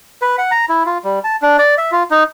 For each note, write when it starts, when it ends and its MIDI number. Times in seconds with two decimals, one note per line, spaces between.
0.22 0.36 71
0.38 0.51 78
0.51 0.65 82
0.69 0.83 64
0.86 0.98 65
1.04 1.19 55
1.24 1.36 81
1.42 1.57 62
1.58 1.75 74
1.78 1.91 76
1.92 2.03 65
2.11 2.23 63